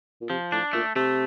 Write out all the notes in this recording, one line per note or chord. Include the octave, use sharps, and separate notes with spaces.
A#2
C3 F3
A2 D4
A#2 A3
C3 A3